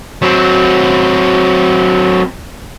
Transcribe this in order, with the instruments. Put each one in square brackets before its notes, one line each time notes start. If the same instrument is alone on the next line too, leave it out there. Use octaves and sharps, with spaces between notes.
[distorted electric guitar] F#3 C4